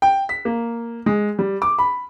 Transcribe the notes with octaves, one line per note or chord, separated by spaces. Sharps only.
G5
B6
A#3
G#3
G3
D6
B5